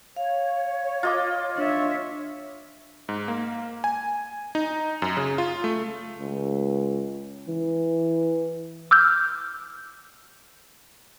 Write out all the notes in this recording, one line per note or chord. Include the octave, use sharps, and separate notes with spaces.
C#5 F5
F4 D#5 D6
D4 C#5 E5
G#2
A#3
G#5
D#4
F#2
C#3
F4
A3
C#2
E3
D6 E6 F6 G6